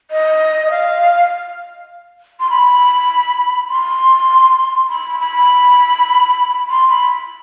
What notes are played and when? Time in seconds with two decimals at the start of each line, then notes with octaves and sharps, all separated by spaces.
0.11 D#5
0.66 D#5
0.71 F5
2.40 C6
2.50 B5
3.70 C6
4.90 B5
5.20 B5
6.70 C6
6.89 B5